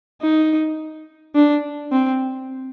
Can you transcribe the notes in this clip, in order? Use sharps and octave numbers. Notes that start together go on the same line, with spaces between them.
D#4
D4
C4